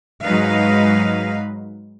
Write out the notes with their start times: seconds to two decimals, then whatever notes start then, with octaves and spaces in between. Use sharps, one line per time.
0.24 G#2 F#3 G#3 D#4 B4 F5